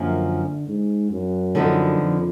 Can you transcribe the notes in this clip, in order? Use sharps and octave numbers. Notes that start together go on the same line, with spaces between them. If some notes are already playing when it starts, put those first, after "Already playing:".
Already playing: F#2 D3 F3 A#3
G#2
F#2
D3 F3 B3 D#4
F2